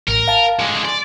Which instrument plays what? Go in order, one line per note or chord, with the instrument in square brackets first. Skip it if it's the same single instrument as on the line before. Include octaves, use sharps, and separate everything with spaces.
[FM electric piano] A1 [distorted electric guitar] A#4
[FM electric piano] F5 A5
[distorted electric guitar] D3 G#3
[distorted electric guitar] D5 [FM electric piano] C6